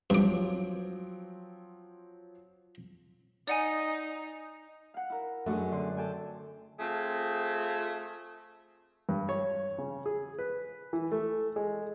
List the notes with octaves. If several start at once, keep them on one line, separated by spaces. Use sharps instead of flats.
G2 F3 F#3 C4 D6
D#4 D5 F#5 G#5
F5 F#5
E4 A#4
F#2 G#3 A3 D4
D3 C4 C6
A4 G5 G#5
A3 C4 F4 G#4
G2
C#5
C#3
G#4
B4
E3
A3
G#3